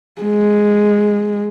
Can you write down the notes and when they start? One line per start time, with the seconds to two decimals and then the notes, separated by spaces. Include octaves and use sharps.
0.21 G#3